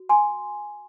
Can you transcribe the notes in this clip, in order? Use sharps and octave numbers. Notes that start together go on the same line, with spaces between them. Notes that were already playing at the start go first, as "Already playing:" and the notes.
Already playing: F#4
G#5 C6